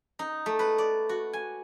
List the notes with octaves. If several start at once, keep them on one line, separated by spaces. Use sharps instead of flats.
D#4
A3
B4
D5
F#4
G#5